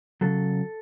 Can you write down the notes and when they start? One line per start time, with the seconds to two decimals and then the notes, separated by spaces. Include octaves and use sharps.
0.21 C#3 F#3 A4